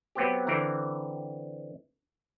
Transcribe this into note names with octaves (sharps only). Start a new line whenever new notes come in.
F#3 B3 C4 G4
D3 E3 C4 A#4